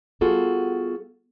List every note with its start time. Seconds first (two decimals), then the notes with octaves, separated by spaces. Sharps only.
0.21 G3 B3 F4 F#4 G#4 A4